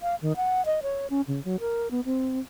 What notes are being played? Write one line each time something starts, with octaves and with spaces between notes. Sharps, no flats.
F5
D#3
F#5
D#5
C#5
C#4
C#3
F#3
A#4
B3
C4